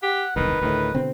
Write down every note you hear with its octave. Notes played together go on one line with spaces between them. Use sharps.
G4 F#5
E1 C2 D#3 B4
D2 A2 D#3
B2 D3 C4